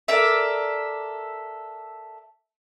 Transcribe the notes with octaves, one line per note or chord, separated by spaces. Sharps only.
A4 A#4 D5 E5